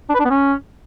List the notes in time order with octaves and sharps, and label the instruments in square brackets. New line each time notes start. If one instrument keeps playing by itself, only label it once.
[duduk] D4
B4
D4
B3
C#4